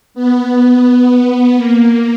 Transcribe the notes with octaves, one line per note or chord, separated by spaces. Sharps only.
B3
A#3